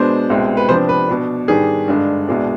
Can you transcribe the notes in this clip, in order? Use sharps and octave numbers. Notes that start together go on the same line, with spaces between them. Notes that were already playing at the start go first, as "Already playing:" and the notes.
Already playing: B2 G#3 B3 D4 C5
C2 B2 G#3 C4
B4
C3 F3 B3 D4 C5
B4
B2 B3 D4
G#2 D#3 G3 B3 D4 G#4
G2 D3 G#3 D4
C2 B2 G#3 D4